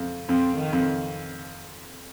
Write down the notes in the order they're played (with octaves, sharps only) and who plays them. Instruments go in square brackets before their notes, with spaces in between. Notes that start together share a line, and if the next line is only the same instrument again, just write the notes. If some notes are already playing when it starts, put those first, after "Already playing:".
Already playing: [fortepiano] F2
[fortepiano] F2 [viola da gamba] C4
[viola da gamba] D#3
[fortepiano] F2